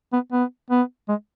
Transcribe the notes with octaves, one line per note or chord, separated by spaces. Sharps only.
B3
B3
B3
G#3